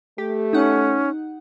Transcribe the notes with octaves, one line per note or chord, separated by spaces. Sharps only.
A3 G4
C#4 D#4 F#5